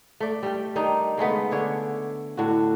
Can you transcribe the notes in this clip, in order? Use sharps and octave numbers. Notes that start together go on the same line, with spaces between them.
A3 D5
G3 G5
D#3 D4 D#4
C#3 G#3 A3 B3
D3 D4 C#5
A2 D3 F#4